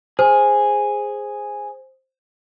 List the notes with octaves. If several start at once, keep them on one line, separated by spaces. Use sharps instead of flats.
G#4 C5